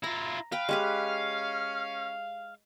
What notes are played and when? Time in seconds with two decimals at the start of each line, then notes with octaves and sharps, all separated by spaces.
0.04 E4 F4 A#5
0.52 B4 F5 G5
0.69 G#3 C#4 G4 B4